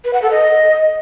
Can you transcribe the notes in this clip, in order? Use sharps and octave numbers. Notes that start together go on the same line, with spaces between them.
B4
F#5
A4
D#5